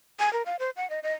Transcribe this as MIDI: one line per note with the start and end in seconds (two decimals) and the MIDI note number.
0.19 0.32 80
0.33 0.42 70
0.46 0.56 77
0.59 0.70 72
0.76 0.88 78
0.90 1.00 75
1.03 1.13 75